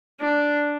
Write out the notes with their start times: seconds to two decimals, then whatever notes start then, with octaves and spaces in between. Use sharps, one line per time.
0.21 D4